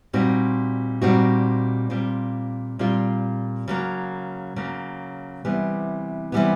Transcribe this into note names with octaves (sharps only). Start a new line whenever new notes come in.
A#2 G3 C4 D#4 F#4
A#2 G3 C4 D#4 F#4
A#2 G3 C4 F4
A#2 G3 C4 F4
C#3 F#3 A#3
C#3 F#3 A#3
C3 E3 G3 B3
C3 E3 G3 B3